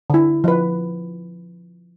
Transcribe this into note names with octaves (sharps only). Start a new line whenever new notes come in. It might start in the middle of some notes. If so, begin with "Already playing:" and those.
D3 E4
F3 B4